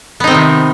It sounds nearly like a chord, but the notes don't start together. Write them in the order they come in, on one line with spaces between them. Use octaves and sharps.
B3 D#4 C4 D#3 C3